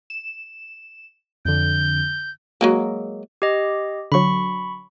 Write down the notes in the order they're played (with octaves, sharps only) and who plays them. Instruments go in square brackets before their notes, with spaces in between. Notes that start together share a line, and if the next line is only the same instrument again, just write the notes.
[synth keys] E7
[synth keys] F2 D3 [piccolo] G6
[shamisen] F#3 G#3 A#3
[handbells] G4 D#5
[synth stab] D3 F#3 [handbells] B5 C#6